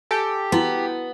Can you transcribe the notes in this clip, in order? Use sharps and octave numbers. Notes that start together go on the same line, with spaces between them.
G4 A4 G#5
B3 E4 F#4